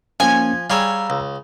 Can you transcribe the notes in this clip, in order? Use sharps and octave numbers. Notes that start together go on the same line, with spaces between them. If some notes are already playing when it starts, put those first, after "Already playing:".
F3 A#3 C#4 G#5
G3 G#4 C#5 F5 A#5 E6
C#2